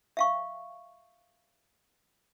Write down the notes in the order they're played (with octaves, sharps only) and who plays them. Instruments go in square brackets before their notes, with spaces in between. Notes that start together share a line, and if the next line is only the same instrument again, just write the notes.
[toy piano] E5 F5 C#6